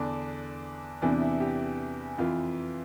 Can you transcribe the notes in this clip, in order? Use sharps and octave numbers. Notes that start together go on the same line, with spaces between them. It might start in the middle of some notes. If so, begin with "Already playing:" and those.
Already playing: E2 D3 D4
E2 C3 E3 D4
E4
G4
F2 E3 F4